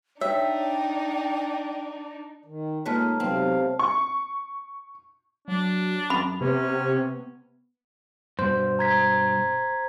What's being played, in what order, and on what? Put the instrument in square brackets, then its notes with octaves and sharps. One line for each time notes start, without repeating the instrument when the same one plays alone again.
[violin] D4 D#4 [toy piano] C#5 [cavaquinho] E5 [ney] G5
[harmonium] D#3
[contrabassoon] A#2 [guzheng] G#3 A3 B4 [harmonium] D#4 [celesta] C#5 A5 F6
[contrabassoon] B1 [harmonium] C3 F5 [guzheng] C4
[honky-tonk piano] C#6
[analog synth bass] F#3 [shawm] D4
[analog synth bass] F#2 [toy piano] B5
[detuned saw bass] C3 [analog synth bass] B3 [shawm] C#4
[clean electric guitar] G2 B2 [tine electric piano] C5
[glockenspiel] A#5 G#6 B6